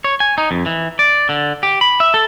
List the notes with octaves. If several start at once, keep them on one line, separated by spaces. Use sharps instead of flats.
C#5
G#5
D#4
F2
E3
D5
D3
G4
B5
E5
A4